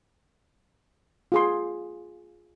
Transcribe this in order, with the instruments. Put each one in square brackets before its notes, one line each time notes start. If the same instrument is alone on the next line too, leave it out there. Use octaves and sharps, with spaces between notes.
[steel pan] F4 G#4 C6